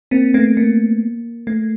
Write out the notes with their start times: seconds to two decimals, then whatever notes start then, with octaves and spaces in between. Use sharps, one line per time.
0.11 A#3 C4
0.34 A3 B3
0.57 A#3
1.47 A3